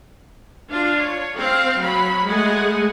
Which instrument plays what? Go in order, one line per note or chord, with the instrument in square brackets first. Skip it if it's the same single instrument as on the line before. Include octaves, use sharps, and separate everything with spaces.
[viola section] D4 F4 F5
C#5
C4 F5
F#3 B5
G#3 A3 F#5 G#5